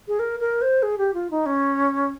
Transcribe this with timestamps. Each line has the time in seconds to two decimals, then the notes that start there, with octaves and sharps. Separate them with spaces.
0.08 G#4
0.19 A#4
0.40 A#4
0.62 C5
0.83 G#4
0.98 G4
1.14 F4
1.31 D#4
1.46 C#4